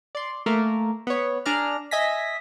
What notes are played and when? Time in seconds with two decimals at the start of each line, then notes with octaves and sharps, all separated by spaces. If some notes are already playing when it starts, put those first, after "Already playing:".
0.15 D5 C6
0.46 A3 A#3 A#4
1.07 B3 C#5
1.46 D4 G#4 D5 A#5 F6
1.91 D#5 E5 G#5 A#6 B6